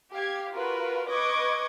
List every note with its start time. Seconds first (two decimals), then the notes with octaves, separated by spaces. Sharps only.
0.13 G4 F5 G#6
0.51 F4 F#4 A#4 B4
1.09 B4 D#5 C#6 D6 G#6